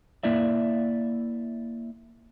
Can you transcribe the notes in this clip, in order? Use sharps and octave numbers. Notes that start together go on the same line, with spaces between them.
A#3 E4 D5 E5